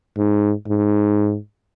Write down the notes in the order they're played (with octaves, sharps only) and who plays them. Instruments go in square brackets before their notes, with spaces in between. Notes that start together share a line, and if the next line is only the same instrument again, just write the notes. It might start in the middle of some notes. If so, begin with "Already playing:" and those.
[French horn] G#2
G#2